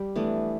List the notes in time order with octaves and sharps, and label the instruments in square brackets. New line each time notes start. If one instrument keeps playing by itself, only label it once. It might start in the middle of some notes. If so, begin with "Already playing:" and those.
Already playing: [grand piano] G3 [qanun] G4
[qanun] E3 B3 D4 [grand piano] A3